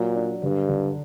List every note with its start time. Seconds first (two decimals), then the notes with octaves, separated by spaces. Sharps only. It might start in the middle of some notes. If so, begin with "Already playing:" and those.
Already playing: A#2 F#3
0.16 D4
0.42 G2 D3
0.69 D3